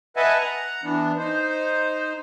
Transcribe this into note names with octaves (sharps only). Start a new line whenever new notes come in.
B4 D#5 E5 F#5 G#5 A5
F#5 A#5
E3 B3 D4
D#4 C5